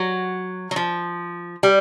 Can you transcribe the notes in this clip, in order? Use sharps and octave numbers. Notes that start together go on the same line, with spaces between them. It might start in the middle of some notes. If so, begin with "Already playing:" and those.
Already playing: F#3
F#3
F3
G3